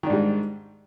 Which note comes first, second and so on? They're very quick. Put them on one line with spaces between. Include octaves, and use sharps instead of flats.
D#3 D4 G#2 G3